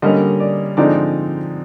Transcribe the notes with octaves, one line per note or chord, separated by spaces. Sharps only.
D3 G3 A#3 C#4 D#5
D5
D3 F3 G#3 C4 D#4 D5